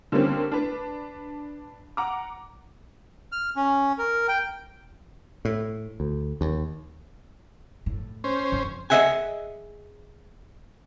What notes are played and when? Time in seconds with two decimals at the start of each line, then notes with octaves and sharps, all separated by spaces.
0.12 D3 G3 A#3 C4 C#4
0.52 D4 B4
1.97 F#5 A#5 D6
3.32 F6
3.56 C#4
3.98 A#4
4.28 G5
5.45 A2
6.00 D2
6.41 D#2
7.86 A2
8.24 C#4 C5
8.52 F2
8.90 G#4 C5 D#5 E5 F#5 G#5